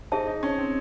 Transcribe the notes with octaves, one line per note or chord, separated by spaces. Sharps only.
D#4 G#4 C5 E5 A5
D#4
C#4
C4